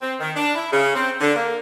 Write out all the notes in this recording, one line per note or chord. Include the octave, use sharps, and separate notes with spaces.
C4
D#3
D4
E4
C#3
C4
D3
A#3